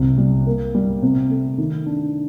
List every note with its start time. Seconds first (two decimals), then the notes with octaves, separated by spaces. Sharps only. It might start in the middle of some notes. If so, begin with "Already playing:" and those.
Already playing: C2
0.18 G3
0.46 A#3
0.75 G3
1.03 C3
1.30 A3
1.58 D#3
1.86 D4